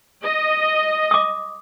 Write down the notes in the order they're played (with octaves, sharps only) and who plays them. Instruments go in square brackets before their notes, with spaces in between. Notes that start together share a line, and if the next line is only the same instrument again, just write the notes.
[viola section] D#5
[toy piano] D6 D#6